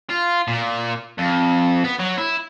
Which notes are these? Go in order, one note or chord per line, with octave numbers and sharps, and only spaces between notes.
F4
A#2
F2
B3
F#3
E4